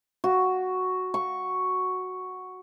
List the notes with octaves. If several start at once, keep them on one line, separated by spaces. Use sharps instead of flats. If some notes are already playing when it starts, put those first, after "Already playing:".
F#4
C#6